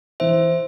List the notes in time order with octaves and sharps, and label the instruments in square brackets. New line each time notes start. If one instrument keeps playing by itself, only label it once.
[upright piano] E3 [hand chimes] C5 E5